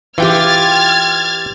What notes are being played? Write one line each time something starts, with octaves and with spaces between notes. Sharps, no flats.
E3 F4 G4 G5 F6 G#6 A6